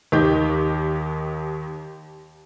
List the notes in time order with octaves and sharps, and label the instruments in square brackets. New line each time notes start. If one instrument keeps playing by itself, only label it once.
[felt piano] D#2 D#3 G4 G6